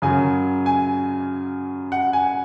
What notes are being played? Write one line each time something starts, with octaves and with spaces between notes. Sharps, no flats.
F#2 C#3 F#3 G#5
G#5
F#5
G#5